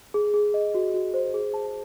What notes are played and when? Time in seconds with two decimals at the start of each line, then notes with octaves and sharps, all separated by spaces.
0.14 G#4
0.34 G#4
0.54 D#5
0.75 F#4
0.94 F#4
1.14 C5
1.34 G#4
1.54 A5